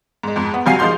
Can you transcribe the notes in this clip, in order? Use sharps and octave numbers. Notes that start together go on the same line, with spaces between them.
G#2 G#3
F2 G#2
B3
G2 C3 F#3 F5 G#5 C7
F3 G#3 D#4 F5 C6 G6